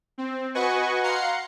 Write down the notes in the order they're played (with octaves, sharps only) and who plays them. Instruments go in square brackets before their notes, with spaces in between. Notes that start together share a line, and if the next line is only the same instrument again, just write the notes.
[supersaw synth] C4
F#4 B4 D#5 F#5 G#5 C#6
F5 F#5 A#5 C6 C7 C#7